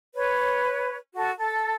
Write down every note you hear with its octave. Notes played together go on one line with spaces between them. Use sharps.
B4 C#5
F#4 A4
A4